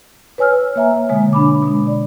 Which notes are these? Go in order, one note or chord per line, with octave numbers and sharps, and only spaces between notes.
B4 C#5 G#5 E6 F6
A#3 C#5 E5 G#5 A#5
B2 D3 G#3 C#5 G#5
D4 B5 D6
B2 G#3
D5